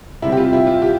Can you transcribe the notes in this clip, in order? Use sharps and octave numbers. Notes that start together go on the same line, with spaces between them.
C3 G3 C4 E4
G4
F4
E4
F4
G4